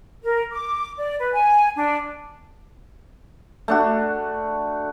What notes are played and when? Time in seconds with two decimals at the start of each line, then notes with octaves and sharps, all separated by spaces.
0.24 A#4
0.52 D6
0.98 D5
1.20 B4
1.34 G#5
1.76 D4
3.68 A3 D4 F#4